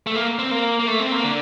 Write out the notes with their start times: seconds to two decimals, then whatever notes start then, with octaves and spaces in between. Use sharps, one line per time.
0.07 A3
0.15 A#3
0.39 C4
0.51 A#3
0.79 A#3
0.88 A3
1.00 C4
1.12 A#3
1.24 D3